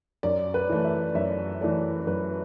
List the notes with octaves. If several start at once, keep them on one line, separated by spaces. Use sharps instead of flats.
F#2 D5
B4
E3 A3
E5
F#2 E5
E3 A3 D5
F#2 B4